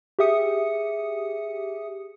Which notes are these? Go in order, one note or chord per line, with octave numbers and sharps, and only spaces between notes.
G4 G#4 E5 D#6 C#7